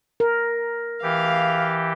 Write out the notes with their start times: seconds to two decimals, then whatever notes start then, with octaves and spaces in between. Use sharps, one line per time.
0.20 A#4
1.03 E3 G4 F5